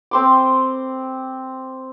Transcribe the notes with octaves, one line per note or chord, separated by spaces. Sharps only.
C4 C6 D6